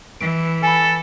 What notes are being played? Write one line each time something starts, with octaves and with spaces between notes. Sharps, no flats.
E3 D7
A4 G#5 B5